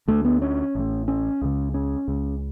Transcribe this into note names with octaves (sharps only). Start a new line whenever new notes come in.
D2 D3 A3
B3
C#4
A1 A2
C#4
C#2 C#3
C#4
C#2 C#3